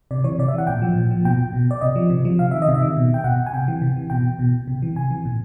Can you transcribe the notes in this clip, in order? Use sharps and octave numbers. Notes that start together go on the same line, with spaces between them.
C3 D5
E3 C#5
C3 D5
E5
E3 F#5
A#2 G5
F3
A#2
F3
B2 G5
B2
D5
C3 D#5
F3
C3
F3
C3 F5
D#3 E5
D#5
C3
E5
D#3
B2
G5
B2 F#5
G#5
C3 G5
E3
C3
E3
B2 G5
B2
C3
E3
C3 G#5
E3
A#2